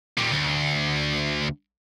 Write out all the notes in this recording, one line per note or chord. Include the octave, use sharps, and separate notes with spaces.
A#2 G3
D2